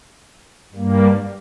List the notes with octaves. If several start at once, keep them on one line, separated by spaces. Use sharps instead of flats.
G2 G3 A#3